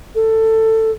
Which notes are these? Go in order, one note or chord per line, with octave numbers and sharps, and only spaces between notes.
A4